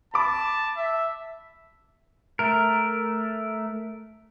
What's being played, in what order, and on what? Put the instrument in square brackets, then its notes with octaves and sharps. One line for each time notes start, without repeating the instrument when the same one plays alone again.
[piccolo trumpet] A5 [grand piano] B5 D6
[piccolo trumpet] E5
[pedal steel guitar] A3 A#4